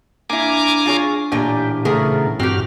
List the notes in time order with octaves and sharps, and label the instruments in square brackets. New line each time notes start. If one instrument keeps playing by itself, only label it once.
[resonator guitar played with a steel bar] A#3 E4 [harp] D4 [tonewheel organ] G#5 A#5 D6
[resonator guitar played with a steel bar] F4 G#4 C#5
[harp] A1 A#2 [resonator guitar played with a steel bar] A#3 D4 G#5 [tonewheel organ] G4
[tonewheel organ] C#3 A3 [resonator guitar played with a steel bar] B3 G#4 A#4
[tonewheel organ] G2 F#4 F6 [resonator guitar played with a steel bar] C4 G4